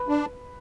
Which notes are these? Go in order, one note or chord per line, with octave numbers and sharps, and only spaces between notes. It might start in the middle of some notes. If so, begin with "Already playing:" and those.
Already playing: B4
D4